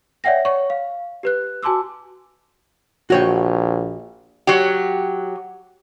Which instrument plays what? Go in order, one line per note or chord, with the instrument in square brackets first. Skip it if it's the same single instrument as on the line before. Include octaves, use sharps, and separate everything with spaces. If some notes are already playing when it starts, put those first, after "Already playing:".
[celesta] C#5 D5 E5 F#5 G5 A#6
C#5 C#6
F5
G4 B4 F#6
F#4 G#5 A5 C6 D6 E6
[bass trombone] A#1 [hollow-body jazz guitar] F#4 C#5 G5
[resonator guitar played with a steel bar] F#3 G4